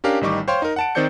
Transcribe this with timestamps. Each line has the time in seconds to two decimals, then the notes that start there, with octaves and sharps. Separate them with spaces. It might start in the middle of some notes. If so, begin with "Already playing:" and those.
0.04 C#4 D4 G4 A#4 F5
0.21 A1 D#3 G3 D#4 C#6 D6
0.48 C5 C#5 F5 G5 C6
0.62 D#4 A#4
0.76 F#5 A5 D7
0.95 D#3 C4 C5 D5 G6 C#7